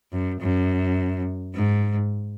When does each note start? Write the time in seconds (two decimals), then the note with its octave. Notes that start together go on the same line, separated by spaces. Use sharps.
0.12 F#2
0.40 F#2
1.54 G#2